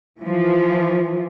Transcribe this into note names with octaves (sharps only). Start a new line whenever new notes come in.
E3 F3